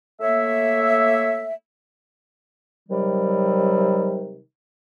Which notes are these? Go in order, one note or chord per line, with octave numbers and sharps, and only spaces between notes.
A3 A#3 C#5 E5
C3 D#3 F#3 G3